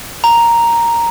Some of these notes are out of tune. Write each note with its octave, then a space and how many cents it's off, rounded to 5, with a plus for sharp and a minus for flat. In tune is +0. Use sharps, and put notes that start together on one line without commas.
A#5 +0